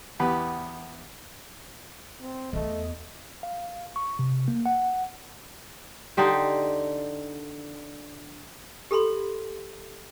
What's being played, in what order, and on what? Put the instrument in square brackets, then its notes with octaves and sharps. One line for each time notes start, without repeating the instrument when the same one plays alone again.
[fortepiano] E2 B3 G4 B4
[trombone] C4
[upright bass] E2 B3 [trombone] A3 [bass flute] D#5
[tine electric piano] F5
C#6
C3
A#3
F#5
[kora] D3 D#4 G4 C5
[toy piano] G4 A4 B5 C6